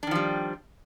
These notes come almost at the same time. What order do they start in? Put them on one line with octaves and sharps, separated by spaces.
D4 D#3 F3 G3